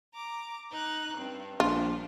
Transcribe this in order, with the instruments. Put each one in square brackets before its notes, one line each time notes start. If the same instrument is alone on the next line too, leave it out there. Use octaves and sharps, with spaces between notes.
[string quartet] A#5 D6
D#4 F#6
G2 C4
[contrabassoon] A#1 [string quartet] F3 G3 D4 [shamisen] F4